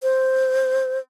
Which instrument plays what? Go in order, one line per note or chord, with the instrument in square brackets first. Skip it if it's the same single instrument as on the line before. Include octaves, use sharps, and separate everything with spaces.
[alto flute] C5